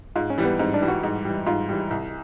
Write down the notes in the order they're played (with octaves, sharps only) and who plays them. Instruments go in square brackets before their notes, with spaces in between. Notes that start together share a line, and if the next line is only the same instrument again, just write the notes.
[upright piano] G#2 [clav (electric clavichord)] F4
[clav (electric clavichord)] C#4
[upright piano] E3 G3
[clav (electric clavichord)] B3
[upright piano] G#2 [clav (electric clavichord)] C4
[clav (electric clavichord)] D4
[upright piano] E3 G3
[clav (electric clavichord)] F#4
[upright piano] G#2
E3 G3
[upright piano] G#2 [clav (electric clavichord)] F4
[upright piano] E3 G3
C2